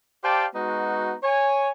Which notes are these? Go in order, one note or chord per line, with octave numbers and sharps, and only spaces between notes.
G4 C5 D5 F5 G5 A5
G#3 B3 D#4 F#4
C#5 G#5